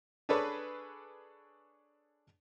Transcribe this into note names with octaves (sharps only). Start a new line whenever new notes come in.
D4 G#4 A4 B4 C#5 D5